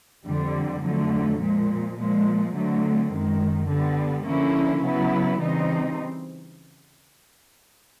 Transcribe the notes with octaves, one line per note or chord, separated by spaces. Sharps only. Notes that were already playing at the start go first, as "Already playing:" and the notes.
F2 D3 G3
F2 D3 F#3 A3
A#2 F3 G#3
A#2 F3 G#3
D3 F#3 A3 C4
F#2 D#3 G#3
D3 G3 B3
D3 F3 A#3 C#4 E4
C#3 F#3 B3 E4
C#3 E3 G3 C4 D#4